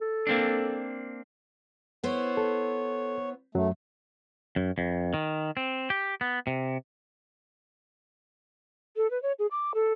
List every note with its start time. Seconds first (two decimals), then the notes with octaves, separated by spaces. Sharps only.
0.01 A4
0.27 A#3 C4 D4
2.04 B3 E4 C5 C#5
2.37 A4
3.55 F#2 F#3 A3
4.56 F#2
4.78 F2
5.14 D#3
5.57 C4
5.90 G4
6.21 B3
6.47 C3
8.96 A4
9.10 B4
9.22 C#5
9.39 G#4
9.51 D6
9.74 A4